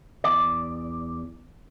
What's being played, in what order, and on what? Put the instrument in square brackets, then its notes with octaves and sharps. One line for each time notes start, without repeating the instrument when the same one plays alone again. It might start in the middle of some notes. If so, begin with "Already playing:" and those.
[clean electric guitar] E2 D5